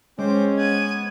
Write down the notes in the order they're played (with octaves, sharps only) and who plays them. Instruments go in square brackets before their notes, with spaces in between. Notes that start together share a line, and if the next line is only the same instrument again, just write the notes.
[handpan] G#3 [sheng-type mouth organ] C4 C5 D6 [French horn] C#4
[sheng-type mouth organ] B3 F#6 [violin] G#6 D#7